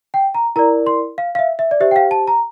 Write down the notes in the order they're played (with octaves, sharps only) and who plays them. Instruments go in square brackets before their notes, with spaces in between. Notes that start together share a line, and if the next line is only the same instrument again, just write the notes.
[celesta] G5
A#5
E4 A#4 D5 A#5
C6
F5
F5
E5
E5
D5
G4 C5 E5
G5
F5
A5
A#5